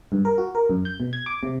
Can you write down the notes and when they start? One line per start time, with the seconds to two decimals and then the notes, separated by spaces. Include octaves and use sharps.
0.12 G2
0.25 A#4
0.38 F#4
0.55 A#4
0.70 F#2
0.85 G6
1.00 B2
1.13 G#6
1.26 D6
1.43 C3